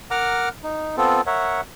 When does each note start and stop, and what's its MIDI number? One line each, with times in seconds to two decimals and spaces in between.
0.11 0.49 70
0.11 0.49 78
0.11 0.49 82
0.11 0.49 86
0.11 0.49 89
0.63 0.96 63
0.97 1.21 59
0.97 1.21 60
0.97 1.21 65
0.97 1.21 69
1.26 1.61 70
1.26 1.61 73
1.26 1.61 76
1.26 1.61 78